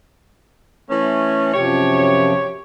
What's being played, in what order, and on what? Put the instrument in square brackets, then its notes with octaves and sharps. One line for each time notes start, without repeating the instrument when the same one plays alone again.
[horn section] E3 A3 C#4
[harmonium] F#2 C3 F3 [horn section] G4 C#5